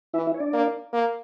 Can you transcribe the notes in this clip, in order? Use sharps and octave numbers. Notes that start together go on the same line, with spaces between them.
E3 E4 E5
E4 E5
C#5
D4 D5
A#3
A#3